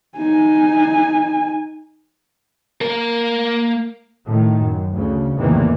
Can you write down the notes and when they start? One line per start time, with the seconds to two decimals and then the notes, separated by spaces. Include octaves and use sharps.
0.18 D#4 G#5
2.81 A#3 A#4
4.26 A2 D#3
4.61 F#2
4.96 D2 C#3
5.37 E2 A2 C3 D#3 E3 A#3